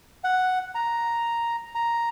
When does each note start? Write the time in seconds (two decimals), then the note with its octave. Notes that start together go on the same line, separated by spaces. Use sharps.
0.24 F#5
0.75 A#5
1.75 A#5